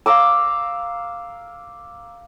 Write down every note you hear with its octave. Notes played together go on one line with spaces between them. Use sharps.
F5 A#5 D6 E6